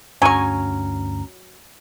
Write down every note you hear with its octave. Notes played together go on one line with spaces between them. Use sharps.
D2 G2 F#3 C#4 D4 G#5 A#5 C#6